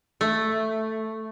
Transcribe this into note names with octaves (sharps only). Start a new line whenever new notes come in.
A3